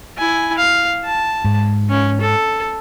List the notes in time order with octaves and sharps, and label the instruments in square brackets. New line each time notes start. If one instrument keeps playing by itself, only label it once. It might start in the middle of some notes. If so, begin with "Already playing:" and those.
[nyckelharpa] E4 G#5
F5
A5
[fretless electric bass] G#2
[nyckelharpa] C#4
A4